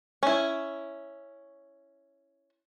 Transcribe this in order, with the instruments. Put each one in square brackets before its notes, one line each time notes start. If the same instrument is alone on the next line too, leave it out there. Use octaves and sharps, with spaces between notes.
[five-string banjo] C#4 E4